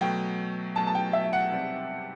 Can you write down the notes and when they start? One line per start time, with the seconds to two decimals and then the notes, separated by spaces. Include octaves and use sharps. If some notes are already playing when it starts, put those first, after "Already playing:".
0.01 B2 F#3 A3 G5
0.76 B2 F#3 A3 A5
0.87 A5
0.95 G5
1.13 E5
1.33 F#5
1.51 C3 G3 C4 G4 D5